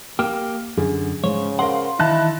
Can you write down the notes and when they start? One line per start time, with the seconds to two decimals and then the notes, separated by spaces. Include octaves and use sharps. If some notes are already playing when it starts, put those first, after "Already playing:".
0.19 A#3 G4 F6
0.78 F#2 D3 G#4
1.24 G#2 C#3 C5 C#5
1.59 A#4 C5 F5 F#5 C6
1.99 D#3 E3 D#4 E4 A5 F#6 A#6